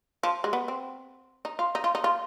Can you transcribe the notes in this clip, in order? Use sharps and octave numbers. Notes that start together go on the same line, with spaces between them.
F3
G#3
B3
C4
D#4
F4
D#4
F4
D#4
F4